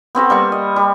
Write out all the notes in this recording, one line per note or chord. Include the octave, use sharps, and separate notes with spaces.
B3 C4 F#4 A4
G3 A#3 C#6
D#5
G3